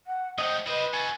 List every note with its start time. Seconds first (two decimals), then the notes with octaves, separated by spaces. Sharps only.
0.06 F#5
0.38 G#3 A3 C5 D#5 G5
0.67 E4 B4 C5 D#5
0.93 F#4 A4 G#5